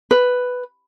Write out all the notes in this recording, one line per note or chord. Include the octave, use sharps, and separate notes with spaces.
B4